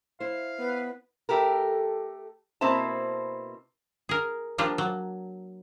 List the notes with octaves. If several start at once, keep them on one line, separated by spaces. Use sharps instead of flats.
E4 C5 F5
B3 B4
A3 G4 A4 A#4
B2 A#3 C4 E4 C5 A5
G#4 A#4
F3 G3 A#3 D4 F4
F#3